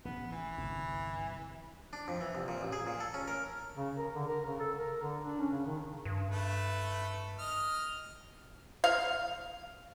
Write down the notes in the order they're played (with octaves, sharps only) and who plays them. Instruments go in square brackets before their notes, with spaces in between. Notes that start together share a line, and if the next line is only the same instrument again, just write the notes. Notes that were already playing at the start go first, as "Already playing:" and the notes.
[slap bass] A1 C3 [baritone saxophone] B3
[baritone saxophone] E3
[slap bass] G1 C2 G2
[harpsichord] D4
F2
E3
C2
A#2
A1
G#4
A#2
A4
C#4
A#4
[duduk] C#3
A#4
D3
A#4
C#3
A4
A#4
D3
D4
C#4
C#3
D#3
[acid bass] G2
[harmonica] A3 A4 B4
D#5 F6
[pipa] F5